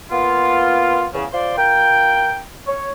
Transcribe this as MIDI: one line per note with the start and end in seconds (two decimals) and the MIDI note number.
0.12 1.05 58
0.12 1.05 59
0.12 1.05 65
1.14 1.25 40
1.14 1.25 49
1.33 1.55 65
1.33 1.55 72
1.33 1.55 74
1.33 1.55 84
1.58 2.40 65
1.58 2.40 70
1.58 2.40 79
2.67 2.91 73